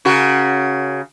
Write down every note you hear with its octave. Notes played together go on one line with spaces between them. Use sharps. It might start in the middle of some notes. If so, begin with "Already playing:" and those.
C#3 F#4 A#4